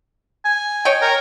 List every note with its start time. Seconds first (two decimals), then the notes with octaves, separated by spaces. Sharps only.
0.45 G#5
0.85 C#5 D#5 G5
1.02 A#4